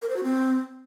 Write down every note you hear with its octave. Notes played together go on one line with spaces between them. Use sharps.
A#4
C5
F#4
C4